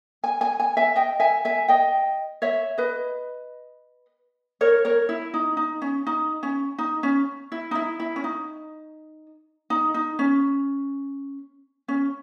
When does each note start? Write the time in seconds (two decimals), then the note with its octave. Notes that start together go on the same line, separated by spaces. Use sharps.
0.24 G#5
0.41 G#5
0.60 G#5
0.77 E5 G#5
0.96 D#5 G5
1.20 E5 G#5
1.45 E5 G#5
1.68 D#5 G5
2.42 C#5 E5
2.78 B4 D#5
4.61 A#4 C#5
4.85 A#4 C#5
5.09 E4
5.34 D#4
5.57 D#4
5.82 C#4
6.07 D#4
6.43 C#4
6.78 D#4
7.03 C#4
7.52 E4
7.71 D#4
7.75 E4
8.00 E4
8.16 C#4
8.24 D#4
9.70 D#4
9.94 D#4
10.19 C#4
11.88 C#4